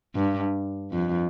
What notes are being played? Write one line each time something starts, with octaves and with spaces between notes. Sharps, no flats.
G2
F2